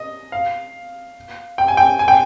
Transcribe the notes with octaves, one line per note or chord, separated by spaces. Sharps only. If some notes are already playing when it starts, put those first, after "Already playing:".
Already playing: D#5
F5
G5
G#5
G5
G#5
G5